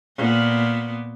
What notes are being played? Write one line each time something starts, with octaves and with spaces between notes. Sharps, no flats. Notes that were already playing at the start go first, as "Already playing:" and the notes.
A#2 B3